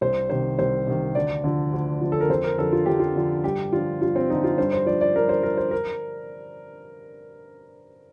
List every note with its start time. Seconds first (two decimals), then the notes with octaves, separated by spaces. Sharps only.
0.01 C2 C5
0.29 C3 D#3 C5
0.59 C2 C5
0.87 C3 D#3
1.15 D2 D5
1.44 D3 F3
1.73 D2
2.01 D3 F3
2.12 A4
2.21 A#4
2.30 F2 C5
2.44 A#4
2.58 D3 F3 A4
2.73 F4
2.86 F2 G4
2.99 F4
3.16 D3 F3
3.44 G2 G4
3.73 D3 F3 F4
4.01 G2 F4
4.16 C4
4.30 D3 F3 D#4
4.44 F4
4.58 G2 C5
4.73 C5
4.86 F3 D5
5.01 D5
5.15 G2 A#4
5.29 C5
5.43 F3 A#4
5.57 C5
5.71 A#4